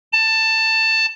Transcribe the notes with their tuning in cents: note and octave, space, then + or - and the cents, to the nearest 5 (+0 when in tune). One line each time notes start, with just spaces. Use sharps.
A5 +15